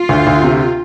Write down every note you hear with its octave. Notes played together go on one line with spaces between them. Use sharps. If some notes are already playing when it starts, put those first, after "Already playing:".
Already playing: F4
D2
D2
C3